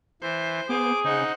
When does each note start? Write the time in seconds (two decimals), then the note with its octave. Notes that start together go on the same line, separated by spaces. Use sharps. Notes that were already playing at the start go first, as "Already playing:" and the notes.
0.22 E3 C5
0.69 B3 G#4 D6
1.04 C#3 D#4 C5 F#5